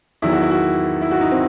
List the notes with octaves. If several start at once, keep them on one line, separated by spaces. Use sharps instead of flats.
E2 D#3 F#3 E4
F#4
E4
F#4
E4
F#4
D#4
C4